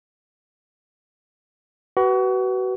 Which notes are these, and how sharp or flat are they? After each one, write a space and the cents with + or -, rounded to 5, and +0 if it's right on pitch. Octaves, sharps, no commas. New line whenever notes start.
F#4 +30 B4 +0